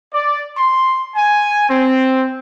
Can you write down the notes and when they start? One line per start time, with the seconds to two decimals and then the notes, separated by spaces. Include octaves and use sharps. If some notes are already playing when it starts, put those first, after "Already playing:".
0.13 D5
0.57 C6
1.16 G#5
1.69 C4